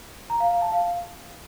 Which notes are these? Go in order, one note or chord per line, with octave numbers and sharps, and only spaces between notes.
A#5
F5
F5
A5
F5